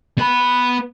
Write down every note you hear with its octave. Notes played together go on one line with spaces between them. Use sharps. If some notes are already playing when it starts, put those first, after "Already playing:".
B3 B5